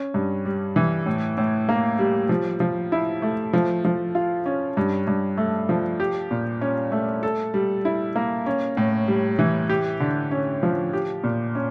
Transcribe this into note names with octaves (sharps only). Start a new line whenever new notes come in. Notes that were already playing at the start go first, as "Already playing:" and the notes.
Already playing: C#4
G2
G3
E3
A2
A2
A#3
G3
F3
F3
E4
A3
F3
F3
F4
C#4
G2
G2
A3
F3
G4
A#2
C#4
A3
A4
G3
E4
A#3
C#4
A2
G3
E3
G4
D3
C#4
F3
G4
A#2
C#4